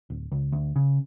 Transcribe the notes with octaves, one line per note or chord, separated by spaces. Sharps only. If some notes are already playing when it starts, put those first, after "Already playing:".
D1
C#2
D2
C#3